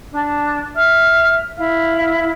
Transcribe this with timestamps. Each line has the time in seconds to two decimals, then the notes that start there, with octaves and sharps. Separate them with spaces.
0.12 D4 A5
0.74 E5 F6
1.57 E4 F5